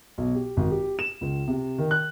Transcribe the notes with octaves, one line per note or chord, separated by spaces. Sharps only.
B1
G4
G#1
G4
E7
C#2
C3
D#3
F#6